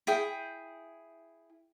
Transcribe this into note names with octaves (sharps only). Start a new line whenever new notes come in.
E4 G#4 G5